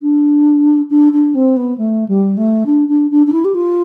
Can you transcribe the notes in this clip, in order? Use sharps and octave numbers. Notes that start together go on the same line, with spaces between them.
D4
D4
D4
C4
B3
A3
G3
A3
D4
D4
D4
D4
E4
G4
F4